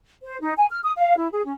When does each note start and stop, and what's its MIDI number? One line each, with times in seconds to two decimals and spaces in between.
0.23 0.39 72
0.40 0.51 63
0.56 0.65 80
0.69 0.79 89
0.84 0.92 87
0.97 1.17 77
1.17 1.27 64
1.31 1.44 68
1.44 1.52 61